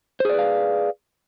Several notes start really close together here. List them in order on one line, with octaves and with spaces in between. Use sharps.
C5 G#4 D5 B4 F5